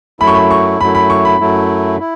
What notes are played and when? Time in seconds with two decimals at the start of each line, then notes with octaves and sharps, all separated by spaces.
0.20 F#2 F#3 A3 E4 B5
0.27 C#6
0.35 B5
0.51 C#6
0.80 F#2 F#3 A3 E4 B5
0.95 B5
1.10 C#6
1.25 B5
1.40 F#2 F#3 A3 E4
2.00 E4